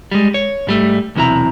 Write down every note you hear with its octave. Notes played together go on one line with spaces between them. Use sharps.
G3 G#3
C#5
G#2 G3 A3
B1 E2 C3 E4 A#5